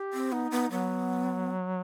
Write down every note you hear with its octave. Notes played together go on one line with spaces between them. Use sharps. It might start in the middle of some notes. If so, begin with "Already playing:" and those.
Already playing: G4
C4
B3 D#4
B3
F#3 B3